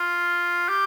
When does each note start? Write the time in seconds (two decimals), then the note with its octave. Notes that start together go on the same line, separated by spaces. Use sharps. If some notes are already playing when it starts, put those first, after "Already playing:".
Already playing: F4
0.68 G4